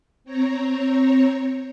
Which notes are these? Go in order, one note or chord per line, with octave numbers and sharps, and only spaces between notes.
C4 C#5 A#5